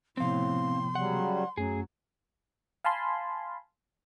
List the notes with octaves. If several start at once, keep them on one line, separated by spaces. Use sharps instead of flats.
A2 C3 F3 B3 C4 F5 C6
C#3 F#3 G3 F#5
F#2 F#3 A3 C#4 G#4
F5 G#5 A5 B5 C6